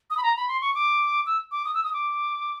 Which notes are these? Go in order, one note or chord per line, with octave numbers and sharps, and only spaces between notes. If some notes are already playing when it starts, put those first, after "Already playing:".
D#6
B5
A#5
B5
C6
C#6
D6
E6
D6
D#6
E6
D#6
D6